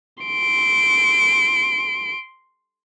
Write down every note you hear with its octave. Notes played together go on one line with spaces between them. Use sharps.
C6 D7